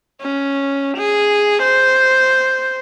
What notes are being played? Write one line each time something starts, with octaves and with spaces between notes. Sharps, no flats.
C#4
G#4
C5